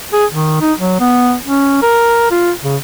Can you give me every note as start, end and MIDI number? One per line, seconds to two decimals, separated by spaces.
0.13 0.25 68
0.31 0.57 51
0.61 0.73 63
0.78 0.98 54
1.00 1.35 59
1.46 1.79 61
1.82 2.28 70
2.31 2.51 65
2.63 2.76 49